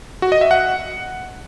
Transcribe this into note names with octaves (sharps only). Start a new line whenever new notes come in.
F#4
D#5
E5
F#5